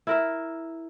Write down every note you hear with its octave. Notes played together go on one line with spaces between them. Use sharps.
E4 A#4 E5